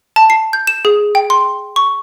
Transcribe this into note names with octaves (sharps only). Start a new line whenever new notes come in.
A5
C7
G6
E7
G#4
G5
C6
C#6